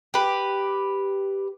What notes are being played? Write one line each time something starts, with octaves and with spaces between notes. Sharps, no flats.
G4 B4